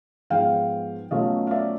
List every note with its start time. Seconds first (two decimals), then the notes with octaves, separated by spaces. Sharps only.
0.30 G#2 F3 G#3 B3 F5 G5
1.11 B2 F#3 A3 C#4 F4 D#5 F5
1.47 F5
1.51 D5 E5